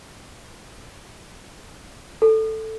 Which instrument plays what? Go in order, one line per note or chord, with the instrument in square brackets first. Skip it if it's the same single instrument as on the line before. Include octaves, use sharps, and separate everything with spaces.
[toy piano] A4